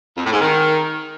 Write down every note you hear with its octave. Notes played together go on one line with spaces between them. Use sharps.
F2
A2
G#2
D#3